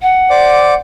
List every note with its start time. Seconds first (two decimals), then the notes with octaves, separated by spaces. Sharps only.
0.02 F#5
0.30 C5 D5 D6